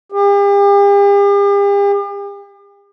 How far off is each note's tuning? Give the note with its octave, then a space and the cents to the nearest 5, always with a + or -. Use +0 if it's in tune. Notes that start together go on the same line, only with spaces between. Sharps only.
G4 +45